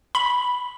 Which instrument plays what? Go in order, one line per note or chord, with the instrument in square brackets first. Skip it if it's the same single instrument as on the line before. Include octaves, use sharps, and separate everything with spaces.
[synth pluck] B5